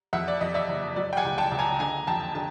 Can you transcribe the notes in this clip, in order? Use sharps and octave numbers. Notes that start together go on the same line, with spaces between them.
F2 E5 F#5
D5
F2 D#5
D5 E5
F#1
F#3 D5
G5
F#5 G#5
C#2
G5 A5
C#2
G#5 A#5
D3 G#5 A#5
F2 G5 A5
D3 A5